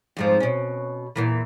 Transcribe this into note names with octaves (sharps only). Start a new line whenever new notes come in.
F2 G#2 F3
B2 C#4
E2 A#2 E3